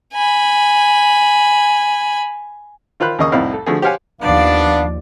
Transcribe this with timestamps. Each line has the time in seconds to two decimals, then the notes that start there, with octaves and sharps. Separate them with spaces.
0.12 G#5 B5
3.00 D#3 F4 C5 B5 F#6
3.19 D#2 C#3 A#3 D#5 C#6 D#6
3.32 C2 F2 A2 D#4 E4 F5
3.53 A4
3.66 D3 F3 A3 F#4 G#4
3.82 G4 C5 C#5 F5 F#5 G#5
4.21 D#2 F3 B3 D4 D5 F5